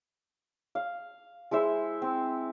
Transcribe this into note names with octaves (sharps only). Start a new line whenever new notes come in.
F5
G#3 E4 C5 E5
C4